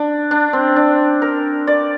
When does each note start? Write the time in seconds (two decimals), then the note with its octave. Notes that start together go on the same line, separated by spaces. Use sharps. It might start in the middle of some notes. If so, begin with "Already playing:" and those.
Already playing: D4
0.31 D4
0.53 C4
0.76 D4
1.22 A#4
1.67 D5